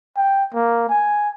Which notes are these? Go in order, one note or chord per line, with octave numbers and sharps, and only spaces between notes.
G5
A#3
G#5